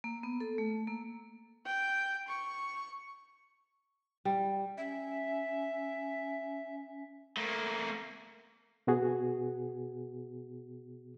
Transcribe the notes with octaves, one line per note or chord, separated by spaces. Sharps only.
A#3
B3
A4
A3
A#3
G5
C#6
G3
C#4 E5
A3 A#3
B2 B3 F#4 G#4